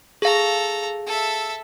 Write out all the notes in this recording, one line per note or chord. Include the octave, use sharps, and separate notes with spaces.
G#4 A4 F5 A#5
A4 E5